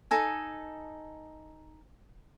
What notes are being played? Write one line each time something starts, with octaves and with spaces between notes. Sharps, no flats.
D#4 A4 G#5